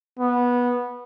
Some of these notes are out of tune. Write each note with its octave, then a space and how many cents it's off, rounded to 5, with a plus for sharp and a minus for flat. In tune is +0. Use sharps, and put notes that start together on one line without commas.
B3 -15